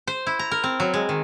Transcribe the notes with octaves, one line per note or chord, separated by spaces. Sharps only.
C5
E4
A#5
A#4
C4
F#3
G#3
D#3